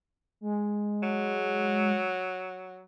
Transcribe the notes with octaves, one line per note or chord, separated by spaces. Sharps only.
G#3
F#3